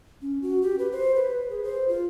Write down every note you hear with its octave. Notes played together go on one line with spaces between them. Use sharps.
C#4
F#4
G4
B4
C5
B4
G#4
C5
F4